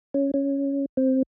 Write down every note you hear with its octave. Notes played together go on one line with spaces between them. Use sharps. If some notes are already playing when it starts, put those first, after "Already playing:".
C#4
C#4
C4